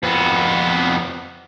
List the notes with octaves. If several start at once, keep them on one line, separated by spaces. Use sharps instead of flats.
F2 B3